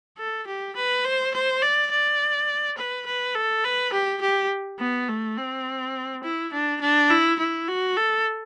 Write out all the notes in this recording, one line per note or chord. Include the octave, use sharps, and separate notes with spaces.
A4
G4
B4
C5
C5
D5
D5
B4
B4
A4
B4
G4
G4
B3
A3
C4
E4
D4
D4
E4
E4
F#4
A4